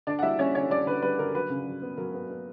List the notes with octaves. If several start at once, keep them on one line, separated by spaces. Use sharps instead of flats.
D3 D4 D5
F#5
G3 E4 E5
G3 C#4 C#5
D3 C#4 C#5
G3 D4 D5
D3 B4
G3 B4
D3 A#4
F#3 B4
C#3
F#3
B3
F#3 A#4
B3
B3